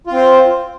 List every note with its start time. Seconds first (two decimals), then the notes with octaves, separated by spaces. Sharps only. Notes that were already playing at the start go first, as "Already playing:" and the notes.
0.07 F4
0.12 C4
0.16 C5